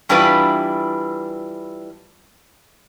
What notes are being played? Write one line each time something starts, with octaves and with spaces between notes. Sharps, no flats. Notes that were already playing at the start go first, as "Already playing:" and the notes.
E3 G3 D4 E4 F4 B4